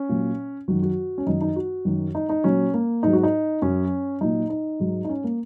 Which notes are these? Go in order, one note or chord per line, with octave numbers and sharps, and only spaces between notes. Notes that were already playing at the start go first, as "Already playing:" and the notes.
Already playing: C#4
A#2 F#3
F#2 D#3 F#3 F#4
F#4
C#4
F#2 D#3 F#3 D#4
D#4
F#4
F#2 D#3 F#3
D#4
D#4
A#2 F#3 C#4
A#3
G#2 F#3 D#4
F#4
D#4
F#2 F#3 C#4
A#2 F#3 D#4
D#4
G#2 F#3
D#4
C#4
A#3